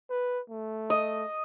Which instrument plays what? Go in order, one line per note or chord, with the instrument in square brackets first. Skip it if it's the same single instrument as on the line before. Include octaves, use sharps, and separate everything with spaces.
[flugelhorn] B4
A3
[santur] D#5